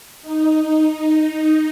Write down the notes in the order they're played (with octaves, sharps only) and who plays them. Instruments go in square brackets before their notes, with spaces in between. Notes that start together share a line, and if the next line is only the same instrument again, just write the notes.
[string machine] D#4